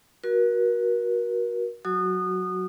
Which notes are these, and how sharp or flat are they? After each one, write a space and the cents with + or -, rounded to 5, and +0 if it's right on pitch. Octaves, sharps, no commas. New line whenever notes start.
F#4 +0 A#4 +35
F#3 +0 F#4 +0 D#6 -25